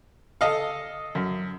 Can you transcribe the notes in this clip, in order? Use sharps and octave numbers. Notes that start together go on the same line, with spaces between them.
A4 D#5 F5
F#2